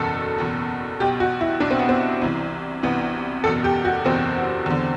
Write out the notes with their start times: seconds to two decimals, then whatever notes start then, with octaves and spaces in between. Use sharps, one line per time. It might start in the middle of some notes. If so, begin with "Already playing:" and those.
Already playing: F#1 E2 B2 A4
0.38 F#1 E2 B2
1.00 B1 B2 G4
1.20 F#4
1.41 E4
1.60 B1 B2 D4
1.71 C4
1.79 B3
1.89 C4
2.21 C2 C3 E3
2.83 C2 C3 E3 B3
3.44 F#1 E2 B2 A4
3.64 G4
3.85 F#4
4.05 F#1 E2 B2 C4
4.66 E2 D3